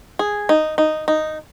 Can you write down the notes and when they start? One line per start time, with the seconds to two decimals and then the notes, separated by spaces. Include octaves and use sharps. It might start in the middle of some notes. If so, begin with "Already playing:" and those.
0.19 G#4
0.49 D#4
0.78 D#4
1.08 D#4